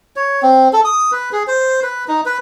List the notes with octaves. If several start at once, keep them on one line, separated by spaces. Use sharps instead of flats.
C#5
C4
A4
D#6
B4
G#4
C5
B4
D#4
B4